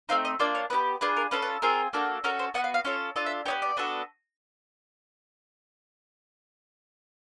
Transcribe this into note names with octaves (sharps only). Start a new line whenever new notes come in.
A3 C4 D#4 F5
D#5
A#3 D4 F4 D5
C#5
B3 E4 G4 B4
D4 F4 G#4 B4
A#4
C#4 F4 A4 B4
B4
C4 F4 G#4 A#4
A#3 D4 F#4 A4
C#4 F#4 A4 A#4
C5
B3 D4 F#4 F#5
F5
F5
C#4 F4 A4 C#5
D4 F4 A4 D#5
E5
B3 D#4 G4 C#5
D5
B3 D4 F#4 A4